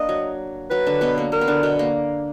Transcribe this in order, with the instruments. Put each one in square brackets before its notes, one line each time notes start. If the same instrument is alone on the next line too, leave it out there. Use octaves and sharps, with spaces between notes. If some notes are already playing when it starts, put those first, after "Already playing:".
Already playing: [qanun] A#3 D4 [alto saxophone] D#5
[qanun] F#3
[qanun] F#3 [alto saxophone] B4
[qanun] D3 D4
B2 B3
A#3
[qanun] A#3 [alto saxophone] A#4
[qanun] B3
D3 D4
B2 B3
A#3